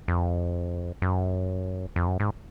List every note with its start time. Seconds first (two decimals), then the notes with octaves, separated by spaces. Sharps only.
0.08 F2
1.02 F#2
1.96 F2
2.07 F#2
2.20 G#2